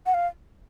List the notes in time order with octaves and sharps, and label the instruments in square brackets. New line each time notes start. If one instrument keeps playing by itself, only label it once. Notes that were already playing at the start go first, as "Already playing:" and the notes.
[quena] F#5
F5